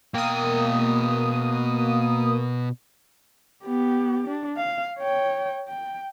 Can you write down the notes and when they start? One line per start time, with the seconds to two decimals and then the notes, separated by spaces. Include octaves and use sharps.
0.14 B2 A#3 G5 D#6
3.64 B3 G4
4.28 D4
4.57 F5
4.99 C#5 G5
5.68 G5